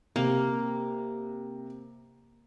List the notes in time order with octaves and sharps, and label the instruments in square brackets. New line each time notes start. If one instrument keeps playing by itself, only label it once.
[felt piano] C3 [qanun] A#3